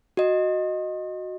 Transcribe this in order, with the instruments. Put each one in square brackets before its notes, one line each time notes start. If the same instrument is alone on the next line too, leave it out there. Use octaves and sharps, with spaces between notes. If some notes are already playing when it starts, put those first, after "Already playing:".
[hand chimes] F#4 D#5